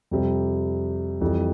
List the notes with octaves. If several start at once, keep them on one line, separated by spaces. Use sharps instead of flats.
F2 C3 G3
F2 E3 G3